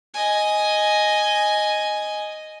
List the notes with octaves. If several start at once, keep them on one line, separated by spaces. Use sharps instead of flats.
D#5 G#5